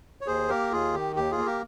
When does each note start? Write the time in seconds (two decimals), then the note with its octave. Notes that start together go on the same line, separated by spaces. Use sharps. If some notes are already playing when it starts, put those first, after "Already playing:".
0.21 C#5
0.27 D#2 G#4 C5
0.49 A#3 G4 A#4
0.71 D#2 F4 G#4
0.94 D#3 G4
1.16 D#2 G4
1.31 F4 G#4
1.38 A#3
1.46 G4 A#4